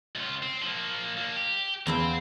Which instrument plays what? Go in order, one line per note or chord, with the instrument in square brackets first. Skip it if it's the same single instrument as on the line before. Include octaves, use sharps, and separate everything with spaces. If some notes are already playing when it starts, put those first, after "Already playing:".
[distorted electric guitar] C#2 F4
C4
F3 A#3
A#3 D4
G4
[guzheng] E2 E4 F5 [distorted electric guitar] C4